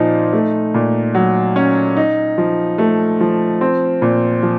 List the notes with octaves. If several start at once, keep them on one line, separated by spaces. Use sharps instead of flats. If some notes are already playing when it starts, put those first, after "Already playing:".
Already playing: A#2 F3 C4 D#4
A3
A#2
F#3
C#4
D#4
F3
A3
F3
C4
A#2
F3